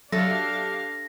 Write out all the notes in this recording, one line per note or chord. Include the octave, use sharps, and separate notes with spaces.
F#3 D4 G4 A4 E5 F5 A#6